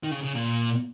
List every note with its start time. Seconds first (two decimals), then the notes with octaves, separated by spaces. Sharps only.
0.04 D#3
0.11 C#3
0.24 C#3
0.35 A#2